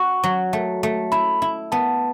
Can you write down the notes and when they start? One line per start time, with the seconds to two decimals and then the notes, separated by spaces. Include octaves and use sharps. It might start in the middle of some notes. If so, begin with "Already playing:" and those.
Already playing: F#4 C#6
0.24 F#3
0.53 A3
0.83 A3
1.12 E4 B5
1.42 E4
1.72 B3 A5